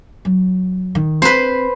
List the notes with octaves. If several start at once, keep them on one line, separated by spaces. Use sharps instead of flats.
F#3
D#3
C4 B4 C5